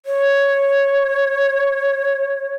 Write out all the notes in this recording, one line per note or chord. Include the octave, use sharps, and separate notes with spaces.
C#5